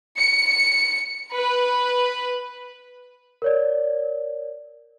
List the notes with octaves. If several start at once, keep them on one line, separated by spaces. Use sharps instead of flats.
C#7
B4
A#4 C#5 D5